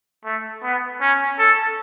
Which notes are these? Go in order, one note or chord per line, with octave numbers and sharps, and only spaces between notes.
A3
B3
C#4
A4